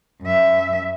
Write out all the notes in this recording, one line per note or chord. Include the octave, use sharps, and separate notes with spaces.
F#2 E5